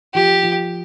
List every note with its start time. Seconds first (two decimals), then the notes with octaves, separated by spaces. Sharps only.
0.14 F3 G4
0.43 F3